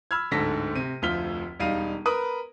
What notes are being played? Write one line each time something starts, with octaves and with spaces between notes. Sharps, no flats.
B5 E6 F6 G#6
D1 G#2 D3 A4 A#6 B6
C3 D#7
F1 D2 F3 F6 B6 G7
E1 G3 D#4 F5 D#7
A#4 B4 B5 D#6